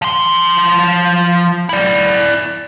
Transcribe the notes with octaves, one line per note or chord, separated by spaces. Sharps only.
F3 C6
E4 D5